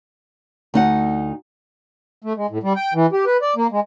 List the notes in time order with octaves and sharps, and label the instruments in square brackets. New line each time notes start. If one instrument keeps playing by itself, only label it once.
[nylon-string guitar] D2 D#4 F#5
[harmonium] A3
G#3
A2
G3
G5
E3
G4
B4
D5
A#3
G#3